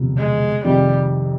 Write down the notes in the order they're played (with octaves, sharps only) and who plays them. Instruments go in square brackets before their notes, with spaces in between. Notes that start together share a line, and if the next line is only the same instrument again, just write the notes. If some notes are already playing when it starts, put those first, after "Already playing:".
Already playing: [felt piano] E1 D2 C3 F3
[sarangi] G#3
[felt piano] F1 F2 C3 D#3 [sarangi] G3